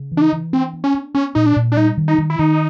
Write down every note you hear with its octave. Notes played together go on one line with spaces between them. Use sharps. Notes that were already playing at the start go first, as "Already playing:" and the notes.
Already playing: C#3
E3
D4
D#4
E3
C4 D4
B3
C#4
D4
B3 C#4
A#2 D#4
D4
A#2
D4
G3 D#4
D#3
D#4
D#3
E4
D#3 D#4